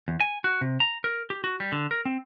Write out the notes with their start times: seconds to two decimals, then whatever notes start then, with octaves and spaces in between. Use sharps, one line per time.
0.08 E2
0.20 G#5
0.44 F#4
0.61 C3
0.80 A#5
1.04 A#4
1.30 G4
1.44 F#4
1.60 G3
1.72 D3
1.91 A#4
2.05 C4